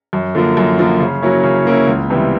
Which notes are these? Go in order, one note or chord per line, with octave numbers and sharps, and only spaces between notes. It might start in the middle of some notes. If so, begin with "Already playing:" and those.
F#2
D3 F3 A#3
F#2
D3 F3 A#3
C#3
F#3 A#3 C#4 E4
C#3
F#3 A#3 C#4 E4
C#2
C3 E3 G3 B3